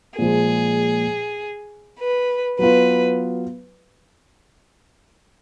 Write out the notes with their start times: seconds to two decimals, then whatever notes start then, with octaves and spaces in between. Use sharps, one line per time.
0.18 A#2 F3 G#3 G#4
1.98 B4
2.59 F#3 B3 F4 B4